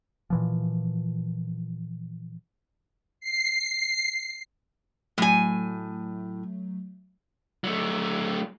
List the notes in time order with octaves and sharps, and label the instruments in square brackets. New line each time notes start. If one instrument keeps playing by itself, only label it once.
[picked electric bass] A#2 E3 F3
[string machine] C7
[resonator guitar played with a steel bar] A2 G#5 [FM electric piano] F#3 A3
[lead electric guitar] F#3 A3